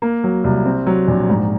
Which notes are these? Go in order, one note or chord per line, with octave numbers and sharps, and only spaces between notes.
A#3
F#3
C2
C4
F#3
A#1
G#2